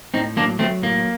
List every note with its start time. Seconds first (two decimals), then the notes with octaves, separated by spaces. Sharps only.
0.14 A2 C4 D#4
0.36 F#3 A#3 D4
0.59 F#3 A3 C4
0.83 A2 A#3